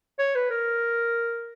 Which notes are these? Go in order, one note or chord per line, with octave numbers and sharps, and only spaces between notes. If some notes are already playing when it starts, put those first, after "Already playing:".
C#5
B4
A#4